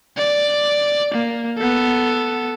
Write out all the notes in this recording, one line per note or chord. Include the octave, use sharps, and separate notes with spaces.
D5
A#3
B3 A4